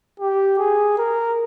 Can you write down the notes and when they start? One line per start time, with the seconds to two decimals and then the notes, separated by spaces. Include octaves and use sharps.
0.20 G4
0.59 G#4
0.98 A#4